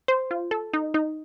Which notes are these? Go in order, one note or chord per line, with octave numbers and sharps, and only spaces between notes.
C5
F4
A4
D#4
D#4